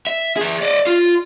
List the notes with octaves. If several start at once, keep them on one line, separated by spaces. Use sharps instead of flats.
E5
G#4 E5
D5 D#5
F4